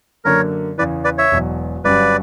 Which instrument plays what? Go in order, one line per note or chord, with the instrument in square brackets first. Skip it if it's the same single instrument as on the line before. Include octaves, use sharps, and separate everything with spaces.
[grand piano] F#2 D3 A#3 [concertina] A#4 C#5
[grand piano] E2 C#3 E3 [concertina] B4 D5
[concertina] B4 D5
C#5 E5
[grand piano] E1 E2 B2 F#3
[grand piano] G1 G2 F#3 C#4 G4 [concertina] B4 D5